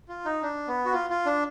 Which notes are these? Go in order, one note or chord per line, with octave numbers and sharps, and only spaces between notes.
F4
D#4
D4
B3
F#4
F4
F4
D4